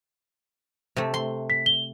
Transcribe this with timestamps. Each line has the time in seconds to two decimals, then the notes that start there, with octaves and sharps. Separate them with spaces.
0.96 C3 A3
1.14 C6
1.50 B6
1.66 G7